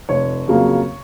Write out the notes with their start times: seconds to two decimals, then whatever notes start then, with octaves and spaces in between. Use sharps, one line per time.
0.09 F1 C#5
0.48 F2 C#3 F#3 A#3